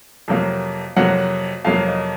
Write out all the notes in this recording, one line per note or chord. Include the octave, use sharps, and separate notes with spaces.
F2 C3 F#3 A#3
F2 C3 F#3 A#3 F#5
F2 C3 F#3 A#3 F5
D#5